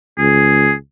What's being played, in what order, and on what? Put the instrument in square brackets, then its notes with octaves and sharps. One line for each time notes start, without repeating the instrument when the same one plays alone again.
[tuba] C#2 [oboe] G#4